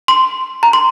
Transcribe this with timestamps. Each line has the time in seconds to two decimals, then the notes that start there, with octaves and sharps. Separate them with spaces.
0.08 C6
0.63 A#5
0.73 C6